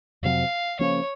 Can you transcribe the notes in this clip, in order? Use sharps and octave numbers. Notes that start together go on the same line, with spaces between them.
F2 C3 F#3 C4 F5
C#3 F3 A#3 C#4 C#5